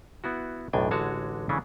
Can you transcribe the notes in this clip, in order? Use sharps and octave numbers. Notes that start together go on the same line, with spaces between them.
B3 E4 F#4
B1 F#2 A2 D4 G5 G#5
A1 D3 G#3 F#4 C#5 A5
C#3 E3 A3 C#4 D4